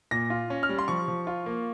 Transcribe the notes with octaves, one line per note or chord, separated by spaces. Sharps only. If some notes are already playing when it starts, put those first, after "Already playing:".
A#2 A#6
F4
C#4
F6
G3
C6
F3 C#6
F3
F4
A#3